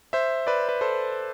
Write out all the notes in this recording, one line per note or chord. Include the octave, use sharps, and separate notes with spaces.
C5 E5
B4 D5
B4
A4 C5